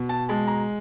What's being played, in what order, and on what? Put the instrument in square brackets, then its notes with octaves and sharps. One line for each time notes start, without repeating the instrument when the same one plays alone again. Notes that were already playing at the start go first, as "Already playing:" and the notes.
Already playing: [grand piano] B2
A5
G#3 A5
A#5